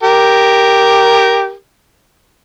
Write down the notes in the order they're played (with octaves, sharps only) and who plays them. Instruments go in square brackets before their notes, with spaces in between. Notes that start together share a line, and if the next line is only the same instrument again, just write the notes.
[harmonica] G4 A#4